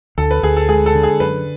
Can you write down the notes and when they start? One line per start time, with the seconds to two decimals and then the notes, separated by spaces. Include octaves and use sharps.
0.18 D2 A4
0.31 B4
0.43 D2 G#4
0.57 A4
0.69 G#3 G#4
0.86 A4
0.95 D3
1.03 G#4
1.20 F#2 B4